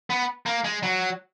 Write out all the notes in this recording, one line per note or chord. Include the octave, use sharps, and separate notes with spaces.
B3
A#3
G#3
F#3